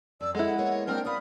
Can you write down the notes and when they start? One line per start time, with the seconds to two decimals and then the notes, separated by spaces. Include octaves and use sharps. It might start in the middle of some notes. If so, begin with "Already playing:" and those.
0.21 F2 D5 E6
0.35 G#3 E4 A4 F#5
0.58 A#3 B3 C#5
0.87 A#3 C4 D4 A#4 G5 F6
1.05 C#5 D5 F5 B5 D#6